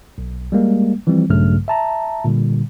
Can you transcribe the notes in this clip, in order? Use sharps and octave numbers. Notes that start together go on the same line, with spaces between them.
B1
G3 G#3 A#3
E3 F3 G3 C4
A#1 G2 C#3 F#3 A3 F6
E5 A5 A#5
A#2 D3 G3